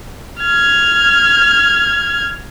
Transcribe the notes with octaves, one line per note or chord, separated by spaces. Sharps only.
F6 G#6